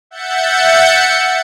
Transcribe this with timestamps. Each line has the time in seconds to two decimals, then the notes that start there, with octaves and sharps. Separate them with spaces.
0.11 E5 F#5 G6 A6 C#7